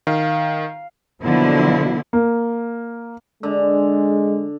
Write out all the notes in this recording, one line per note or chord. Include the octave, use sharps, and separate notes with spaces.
D#3 F5
B2 D3 F3 F#3 A#3 E4
A#3
D3 G#3